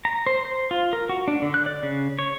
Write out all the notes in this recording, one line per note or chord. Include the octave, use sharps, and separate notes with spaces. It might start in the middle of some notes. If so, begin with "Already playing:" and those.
A#5
C5
C5
F4
A#4
F#4
D4
D3
F#6
D5
C#3
C#5